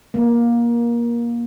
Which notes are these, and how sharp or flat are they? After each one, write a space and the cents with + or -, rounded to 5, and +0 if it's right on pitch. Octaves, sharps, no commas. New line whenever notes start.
A#3 +20